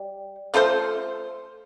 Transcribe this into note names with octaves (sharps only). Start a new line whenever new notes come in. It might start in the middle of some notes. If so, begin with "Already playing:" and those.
Already playing: G3
A3 F4 A4 C5